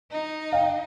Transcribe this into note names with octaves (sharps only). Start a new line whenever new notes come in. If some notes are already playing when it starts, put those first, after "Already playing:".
D#4
F5 G5